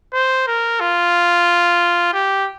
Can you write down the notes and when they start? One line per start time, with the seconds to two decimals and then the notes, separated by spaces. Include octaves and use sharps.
0.14 C5
0.47 A#4
0.80 F4
2.13 G4